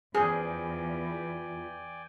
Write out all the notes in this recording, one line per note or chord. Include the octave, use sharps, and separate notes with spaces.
E2 E3 F3 G#4 D5 G5 G#5